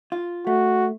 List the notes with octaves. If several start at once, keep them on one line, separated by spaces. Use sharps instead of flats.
F4
A3 F#4